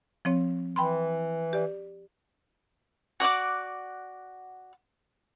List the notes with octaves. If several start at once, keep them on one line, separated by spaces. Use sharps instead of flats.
F3 C4 C#5
E3 G5 B5 C6
G4 D5
F#4 D5 F#5 D6